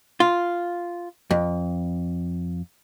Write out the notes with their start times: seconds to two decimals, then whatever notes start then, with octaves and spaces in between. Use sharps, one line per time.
0.20 F4
1.31 F2